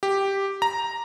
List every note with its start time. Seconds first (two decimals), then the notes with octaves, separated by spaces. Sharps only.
0.03 G4
0.62 A#5